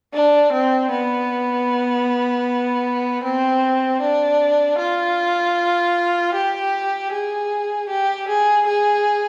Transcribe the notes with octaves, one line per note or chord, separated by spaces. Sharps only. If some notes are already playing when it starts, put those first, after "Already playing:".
D4
C4
B3
C4
D4
F4
G4
G#4
G4
G#4
G#4